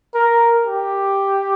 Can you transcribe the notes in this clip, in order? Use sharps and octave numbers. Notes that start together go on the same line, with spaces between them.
A#4
G4